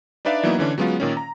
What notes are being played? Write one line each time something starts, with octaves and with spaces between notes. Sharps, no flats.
D4 D#4 B4 D5 E5 F5
E3 F#3 A#3 B3 D#4 E4
D3 E3 C#4 D4
F#3 G#3 B3 C#4 F4
A#2 D#3 C#4
A#5